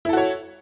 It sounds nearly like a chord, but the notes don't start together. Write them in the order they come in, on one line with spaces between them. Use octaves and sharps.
E4 A4 F#4 C#5